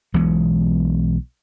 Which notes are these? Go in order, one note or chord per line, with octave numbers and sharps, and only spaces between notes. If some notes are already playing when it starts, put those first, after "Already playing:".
B1 E3 G#3 B3